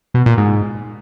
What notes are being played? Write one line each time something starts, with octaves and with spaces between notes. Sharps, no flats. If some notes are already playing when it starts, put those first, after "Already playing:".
B2
A#2
G#2